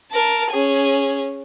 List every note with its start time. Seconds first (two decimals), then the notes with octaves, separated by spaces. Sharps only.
0.12 A#4 A5
0.51 C#4 G#4